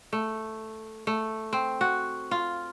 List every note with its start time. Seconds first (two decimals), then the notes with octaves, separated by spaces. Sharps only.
0.13 A3
1.07 A3
1.53 C4
1.81 F#4
2.31 F4